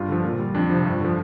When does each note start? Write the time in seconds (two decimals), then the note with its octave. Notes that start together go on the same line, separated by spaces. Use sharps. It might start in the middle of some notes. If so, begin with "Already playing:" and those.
Already playing: G2 F4
0.08 D3 F3
0.24 A#2
0.39 G3
0.54 F2 D4
0.70 C3 F3
0.85 G2
1.01 D3 F3